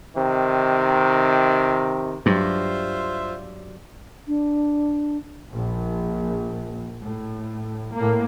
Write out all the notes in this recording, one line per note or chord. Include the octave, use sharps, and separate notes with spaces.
C3 D#3
G2 F#3 F4 G4 C5 D5 E5
D4
A#1
A2
A2 A#3